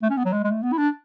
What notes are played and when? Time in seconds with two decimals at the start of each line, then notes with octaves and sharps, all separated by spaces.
0.02 A3
0.10 C#4
0.17 B3
0.25 F#3
0.33 G#3
0.44 G#3
0.47 A3
0.62 B3
0.73 E4
0.78 D4